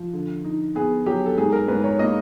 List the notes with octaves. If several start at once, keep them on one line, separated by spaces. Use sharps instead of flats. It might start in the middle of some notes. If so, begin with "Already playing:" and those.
Already playing: F3
D3
D#4
B3 G#4
F#3 G4
A4
G#2 G#4
A#4
G#2 B4
C#5
A#3 D#5